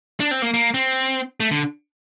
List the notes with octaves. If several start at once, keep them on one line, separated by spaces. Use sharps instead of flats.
D4
C4
A#3
A#3
C4
A3
D3